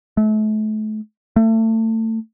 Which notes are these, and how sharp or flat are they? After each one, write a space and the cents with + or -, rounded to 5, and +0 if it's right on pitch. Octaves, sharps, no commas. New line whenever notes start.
A3 -35
A3 +30